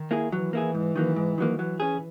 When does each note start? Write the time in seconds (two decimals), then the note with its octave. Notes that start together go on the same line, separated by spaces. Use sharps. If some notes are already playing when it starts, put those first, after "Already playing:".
Already playing: D#3
0.11 A#3 E4 G#4
0.32 E3 F#3
0.53 A#3 E4 G#4
0.75 G#2
0.96 D#3 F#3 A#3
1.16 G#2
1.38 D#3 F#3 A#3
1.59 E3 F#3
1.80 C#4 G#4